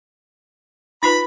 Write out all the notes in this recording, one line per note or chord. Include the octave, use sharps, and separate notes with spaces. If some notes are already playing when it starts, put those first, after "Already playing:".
D#4 F4 B4 B5